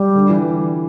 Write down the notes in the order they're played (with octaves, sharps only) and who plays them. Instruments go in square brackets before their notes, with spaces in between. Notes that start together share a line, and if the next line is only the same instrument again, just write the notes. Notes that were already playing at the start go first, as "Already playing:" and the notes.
Already playing: [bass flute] G3
[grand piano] D3
E3